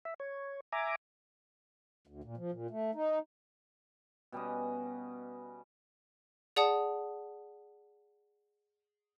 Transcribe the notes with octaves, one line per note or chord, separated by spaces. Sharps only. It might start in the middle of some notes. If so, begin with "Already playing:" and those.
E5
C#5
E5 G#5 A#5 D6
D2
A#2
F3
A#2
A3
D#4
B2 G3 C#4 D#5
G#4 D5 F#5 A5 D#6